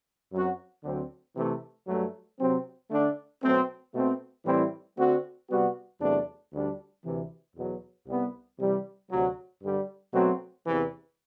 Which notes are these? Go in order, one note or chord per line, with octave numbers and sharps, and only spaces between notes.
F#2 F#3 C4 F#4
D2 D3 F#3 C4
C3 E3 A3
G2 F#3 A3
C3 F#3 C4
D3 A3 D4
B2 F#3 A3 C4
B2 A3 C4
A2 E3 G3 C4 E4
D3 A3 C4 F#4
C3 G3 B3 F#4
E2 C3 F#3 A3 D4
D2 D3 G3 D4
D2 C3 E3
E2 B2 F#3
C2 C3 G3 B3
C3 E3 G3
D2 C3 F#3
G2 D3 G3
B2 F#3 A3 C4 F#4
E2 C3 E3